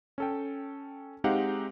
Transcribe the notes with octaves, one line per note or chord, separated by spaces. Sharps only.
C#4 A4 G5
G#3 C4 D#4 G4 F5 F#5